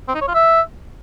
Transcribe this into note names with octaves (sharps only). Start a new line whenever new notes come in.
C4
D#4
C#5
F4
E5